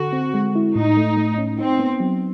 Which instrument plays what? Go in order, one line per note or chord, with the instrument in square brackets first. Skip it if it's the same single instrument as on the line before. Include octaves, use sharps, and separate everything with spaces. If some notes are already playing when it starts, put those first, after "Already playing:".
Already playing: [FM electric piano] D3 A4 [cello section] F#4
[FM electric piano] C4
G#3
E4
[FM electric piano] A2 [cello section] D#4
[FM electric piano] A3
A3
C#4
[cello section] C4 [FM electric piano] D#4
[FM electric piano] B3
F#3